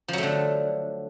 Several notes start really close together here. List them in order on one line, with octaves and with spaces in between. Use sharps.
F3 F#3 A3 D3